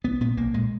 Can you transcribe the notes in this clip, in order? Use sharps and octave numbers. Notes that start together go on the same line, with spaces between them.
B1 B3
A#2 B3
B1 A#3
A#2 G#3